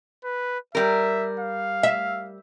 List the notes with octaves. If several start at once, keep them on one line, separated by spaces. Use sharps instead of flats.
B4
G3 A#4 E5
F5
E5